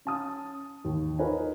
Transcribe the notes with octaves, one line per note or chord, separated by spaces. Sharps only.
C#4 A5 D#6
D#2 D#3
D#4 F4 A#4 B4 C#5 G#5